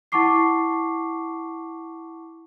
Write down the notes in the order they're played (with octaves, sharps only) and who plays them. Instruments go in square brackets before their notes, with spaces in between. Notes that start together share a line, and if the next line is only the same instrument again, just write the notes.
[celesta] E4 F#5 A5 C#6 D6 C7